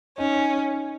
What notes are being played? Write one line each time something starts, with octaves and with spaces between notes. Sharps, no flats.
C#4 D#4